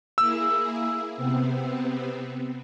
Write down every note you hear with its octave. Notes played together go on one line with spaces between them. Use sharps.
A#3 E4 G#4 E6
C3 B3 C4